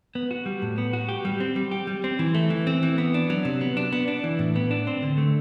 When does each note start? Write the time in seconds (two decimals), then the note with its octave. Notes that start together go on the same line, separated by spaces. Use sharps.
0.15 B3
0.31 F#4
0.46 G3
0.62 A2
0.78 B3
0.93 F#4
1.09 G4
1.25 G3
1.40 C4
1.56 G3
1.71 G4
1.87 G3
2.04 C4
2.19 E3
2.34 A3
2.50 E3
2.67 C4
2.83 E3
2.98 B3
3.14 D4
3.30 F#3
3.45 C3
3.61 B3
3.77 D4
3.92 B3
4.08 D4
4.24 E3
4.39 A2
4.56 B3
4.71 D4
4.87 C4
5.03 D3
5.18 A3